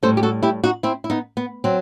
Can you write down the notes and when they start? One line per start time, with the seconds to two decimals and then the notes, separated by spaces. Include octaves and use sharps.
0.03 A2 G3 A4 C5
0.17 G4
0.23 F#4 A4
0.43 E4 G4
0.64 D#4 F#4
0.83 C4 E4
1.04 E4
1.10 B3 D#4
1.37 B3
1.64 F#3 C4